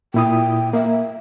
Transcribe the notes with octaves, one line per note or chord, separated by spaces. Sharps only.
A#2 E4 G5 D#6
A#3 E5